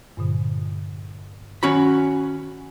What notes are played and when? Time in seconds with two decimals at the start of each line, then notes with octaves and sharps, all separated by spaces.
0.17 G2 A#2 D3
1.63 D#3 C#4 F#4 B5